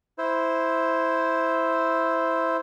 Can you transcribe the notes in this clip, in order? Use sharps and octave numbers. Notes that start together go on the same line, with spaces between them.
E4 C5